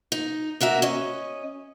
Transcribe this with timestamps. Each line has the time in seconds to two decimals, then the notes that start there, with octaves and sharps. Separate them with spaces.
0.12 D#4
0.61 A#3 F#4 A#4 E5
0.82 C#4 D#5